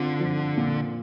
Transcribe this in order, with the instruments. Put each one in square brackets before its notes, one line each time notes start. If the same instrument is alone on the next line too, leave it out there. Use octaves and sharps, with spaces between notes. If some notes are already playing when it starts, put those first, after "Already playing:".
Already playing: [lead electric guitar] D3 [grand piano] C4 F4
[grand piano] F3
A#2